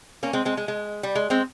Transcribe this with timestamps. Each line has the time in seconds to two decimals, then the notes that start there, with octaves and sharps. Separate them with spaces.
0.23 A#3 C#4
0.33 G#3 C4
0.45 G#3 C4
0.57 G#3
0.68 G#3
1.03 G3
1.15 G#3
1.30 G#3 C4